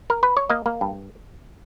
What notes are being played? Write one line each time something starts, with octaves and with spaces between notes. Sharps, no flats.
A#4
B4
C#5
A#3 D#5
A#3
G2